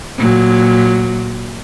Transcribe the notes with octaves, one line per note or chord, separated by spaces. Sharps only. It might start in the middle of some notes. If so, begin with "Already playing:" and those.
A#2 F#3